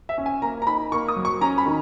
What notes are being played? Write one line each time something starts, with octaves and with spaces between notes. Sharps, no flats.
E5
C#4
G#5
A#3 A#5
A#5
D#4 B5
A#3 C#6
D#6
F#3
C#6
C#4 A#5
B5
D#3